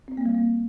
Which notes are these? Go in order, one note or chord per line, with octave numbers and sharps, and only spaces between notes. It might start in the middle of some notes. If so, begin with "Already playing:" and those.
C4
A#3
G3
A#3